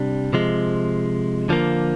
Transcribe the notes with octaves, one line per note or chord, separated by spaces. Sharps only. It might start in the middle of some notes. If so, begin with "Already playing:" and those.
Already playing: C3 G3 D4
C3 F3 G#3
D3 F3 A#3